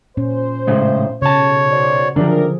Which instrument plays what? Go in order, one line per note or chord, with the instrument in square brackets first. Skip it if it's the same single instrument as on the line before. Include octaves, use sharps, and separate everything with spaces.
[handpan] A#2 C#4 [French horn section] C5
[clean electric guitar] A2 C#3 G#3
[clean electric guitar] B1 A5 [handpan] C#3 [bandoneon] C#5
[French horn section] F#4 C5 D5
[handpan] D3 F3 G#4 [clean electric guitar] F#3 D4 [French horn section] A#4